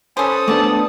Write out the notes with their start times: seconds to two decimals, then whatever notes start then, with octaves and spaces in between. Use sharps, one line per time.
0.17 C#4 A4 B4 C5 D#6
0.48 A3 B3 D4 D5 A5